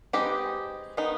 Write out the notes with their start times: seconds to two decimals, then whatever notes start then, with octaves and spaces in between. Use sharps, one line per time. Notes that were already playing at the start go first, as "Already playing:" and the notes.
0.13 G#3 C4 D#4 G4 B4
0.97 D#3 B3 D#4